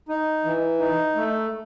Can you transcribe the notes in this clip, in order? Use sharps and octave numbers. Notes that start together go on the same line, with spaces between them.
D#4
E3
D#4
A3